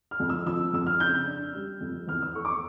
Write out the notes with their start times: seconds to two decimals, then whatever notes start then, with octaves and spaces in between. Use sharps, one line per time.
0.11 F6
0.20 F2
0.30 E6
0.46 F3 E6
0.73 F2 E6
0.87 F6
1.00 C#3 G6
1.27 D4
1.54 G3
1.81 F2
2.07 E2 F6
2.22 E6
2.35 A3 C#6
2.45 D6
2.48 C#6